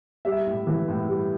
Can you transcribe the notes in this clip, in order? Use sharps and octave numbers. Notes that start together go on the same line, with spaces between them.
G3 E5
A2
E3
A2
G3